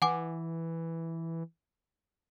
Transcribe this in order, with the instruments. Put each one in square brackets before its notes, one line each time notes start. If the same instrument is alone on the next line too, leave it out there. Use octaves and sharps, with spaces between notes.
[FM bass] E3 [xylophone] F#5 G#5 D6